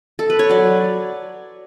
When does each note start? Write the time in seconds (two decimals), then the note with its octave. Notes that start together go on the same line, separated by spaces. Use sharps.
0.19 A4
0.30 B4
0.39 C#5
0.49 F#3 D5